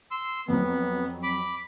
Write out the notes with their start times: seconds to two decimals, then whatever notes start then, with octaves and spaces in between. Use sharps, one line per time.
0.11 C6 E6
0.48 F2 F#3 B3
1.23 B5 D6